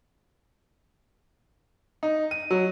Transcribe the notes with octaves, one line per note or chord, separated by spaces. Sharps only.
D#4
D#7
F#3